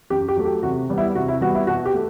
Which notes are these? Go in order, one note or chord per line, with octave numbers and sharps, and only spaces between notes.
F#2 G4
G4
F#3 A3
G4
C3 F#4
G3 B3
E4
C3 F#4
E4
G3 B3 F#4
E4
B2 F#4
G4
A3